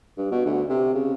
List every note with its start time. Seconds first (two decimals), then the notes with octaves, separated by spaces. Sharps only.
0.17 G2
0.31 B2
0.45 D2
0.69 C3
0.94 C#3